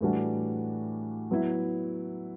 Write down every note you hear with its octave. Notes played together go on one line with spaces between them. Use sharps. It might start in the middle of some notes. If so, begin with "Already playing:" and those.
A2 E3 G3 D4 F#4
F#3 B3 E4